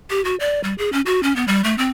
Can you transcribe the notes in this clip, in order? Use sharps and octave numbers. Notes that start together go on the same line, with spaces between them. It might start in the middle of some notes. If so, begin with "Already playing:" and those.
G4
F#4
D5
G3
G#4
C#4
F#4
C#4
B3
G3
A3
C4